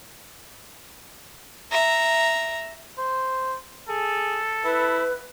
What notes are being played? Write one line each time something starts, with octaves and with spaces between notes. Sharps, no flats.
E5 A#5
C5
G#4 A4
E4 B4